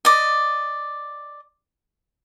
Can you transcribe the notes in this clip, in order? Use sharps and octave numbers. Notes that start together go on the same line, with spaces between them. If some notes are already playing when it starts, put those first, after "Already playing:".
D5 D#5